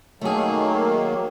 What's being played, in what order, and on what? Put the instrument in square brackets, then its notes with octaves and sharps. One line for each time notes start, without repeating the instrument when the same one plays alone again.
[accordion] D#3 F#3 A#3 [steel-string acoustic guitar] A3 G#4